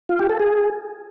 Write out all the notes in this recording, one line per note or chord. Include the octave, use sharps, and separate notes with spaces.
F4
G4
A4
G#4